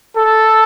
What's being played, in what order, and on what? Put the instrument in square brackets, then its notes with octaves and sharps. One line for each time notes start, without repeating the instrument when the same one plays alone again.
[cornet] A4